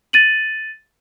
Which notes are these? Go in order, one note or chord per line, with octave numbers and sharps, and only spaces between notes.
A6 D#7 F#7